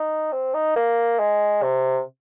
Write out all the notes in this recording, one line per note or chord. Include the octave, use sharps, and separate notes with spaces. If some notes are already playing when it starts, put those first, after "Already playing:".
Already playing: D#4
C4
D#4
A#3
G#3
C3